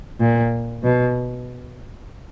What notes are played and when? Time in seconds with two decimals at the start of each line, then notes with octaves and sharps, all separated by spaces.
0.20 A#2
0.83 B2